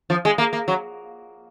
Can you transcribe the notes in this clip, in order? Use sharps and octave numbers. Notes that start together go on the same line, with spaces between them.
F3
G#3
A#3
A#3
F#3